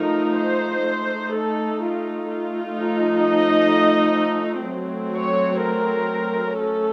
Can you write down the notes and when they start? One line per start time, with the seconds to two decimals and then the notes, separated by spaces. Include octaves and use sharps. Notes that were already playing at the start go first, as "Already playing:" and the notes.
Already playing: F3 A3 D#4 A#4
0.38 C5
0.86 A3 D#4
1.33 A4
1.81 F4
2.29 F4
2.76 F3 A3 D#4
3.23 D#5
4.66 F#3 A3 C4
5.13 C#5
5.61 A#4
6.57 A3 C#4 A4